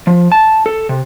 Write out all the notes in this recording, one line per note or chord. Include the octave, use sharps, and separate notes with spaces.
F3
A5
A4
C3